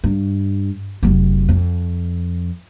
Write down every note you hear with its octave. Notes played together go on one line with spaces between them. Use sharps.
G2
F1 F#3
F2